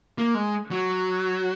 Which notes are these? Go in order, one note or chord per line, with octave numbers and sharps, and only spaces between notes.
A#3
G#3
F#3